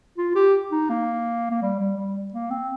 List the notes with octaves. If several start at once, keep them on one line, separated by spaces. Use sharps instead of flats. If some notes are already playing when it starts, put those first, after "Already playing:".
F4
G4
D#4
A#3
A#3
G3
G3
G3
A#3
C4